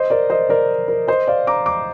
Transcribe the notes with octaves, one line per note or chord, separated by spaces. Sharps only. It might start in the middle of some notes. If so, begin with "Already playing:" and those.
Already playing: C5 D#5
A#4 D5
C5 D#5
A#4 D5
A#4
C5 D#5
D5 F5
A#5 D6
A#5 D6